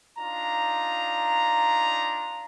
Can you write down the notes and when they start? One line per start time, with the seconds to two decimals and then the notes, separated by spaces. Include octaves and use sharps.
0.19 D4 D#4 F4 A#5